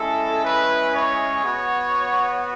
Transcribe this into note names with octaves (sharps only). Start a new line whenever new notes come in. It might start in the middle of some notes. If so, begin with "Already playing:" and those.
Already playing: G#3 C#4 E4 A4
B4
C#5
B3 F#4